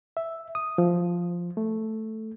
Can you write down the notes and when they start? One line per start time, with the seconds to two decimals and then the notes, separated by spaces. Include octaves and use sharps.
0.17 E5
0.55 D#6
0.78 F3
1.57 A3